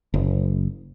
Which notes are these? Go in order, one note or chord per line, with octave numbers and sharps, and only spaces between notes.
F#1